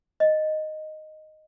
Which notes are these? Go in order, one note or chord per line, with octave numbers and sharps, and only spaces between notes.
D#5